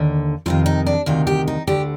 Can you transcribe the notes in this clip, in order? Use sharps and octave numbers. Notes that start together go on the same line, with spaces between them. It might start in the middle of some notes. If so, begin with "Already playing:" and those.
Already playing: D#2 D3
F2 C3 D#3 F4
D#4
D4
D2 C3 D#3 F4
G4
D#4
D2 D3 G4